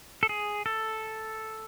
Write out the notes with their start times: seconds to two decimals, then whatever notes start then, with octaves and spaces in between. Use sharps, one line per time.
0.23 A4
0.29 G#4
0.66 A4